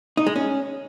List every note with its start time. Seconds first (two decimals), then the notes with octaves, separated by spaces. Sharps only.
0.17 D#4
0.27 G#3
0.36 C#4